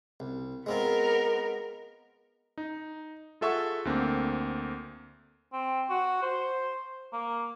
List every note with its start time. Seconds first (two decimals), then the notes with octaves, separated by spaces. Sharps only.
0.20 C2
0.66 G#3 B3 C4 F4 A#4
2.58 D#4
3.41 F4 G#4 A4 E5 F#5 C#6
3.85 D2 D3 A#3 C4
5.53 C4
5.90 F#4
6.23 C5
7.13 A#3